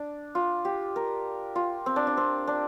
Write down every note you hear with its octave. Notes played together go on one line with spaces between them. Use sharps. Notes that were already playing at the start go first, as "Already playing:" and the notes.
Already playing: D4
F4
G4
A#4
F4
C4
D4
D4
C4
D4